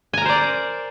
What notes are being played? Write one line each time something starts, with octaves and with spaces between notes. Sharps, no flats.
A#4 C5 D5 G#5 A#5